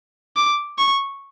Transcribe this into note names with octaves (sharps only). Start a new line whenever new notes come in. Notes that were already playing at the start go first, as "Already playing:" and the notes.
D6
C#6